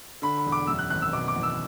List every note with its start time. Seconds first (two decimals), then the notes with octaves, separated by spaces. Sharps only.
0.22 D3 B5
0.38 B5
0.46 E1
0.52 D6
0.67 F#2 E6
0.79 F#6
0.90 G#1 F#6
1.02 E6
1.12 B2 D6
1.28 D6
1.36 E2
1.43 E6